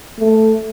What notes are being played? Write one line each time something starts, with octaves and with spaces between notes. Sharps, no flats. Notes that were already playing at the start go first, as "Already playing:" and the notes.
A3